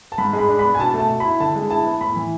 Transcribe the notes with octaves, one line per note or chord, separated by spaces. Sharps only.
A5
G#2 B5
G#3
B5
D4
B5
B3
G#5
B2 A5
A3 A5
B2
B5
E4
D3 A5
G#3
E4 A5
B3
A2 B5
E3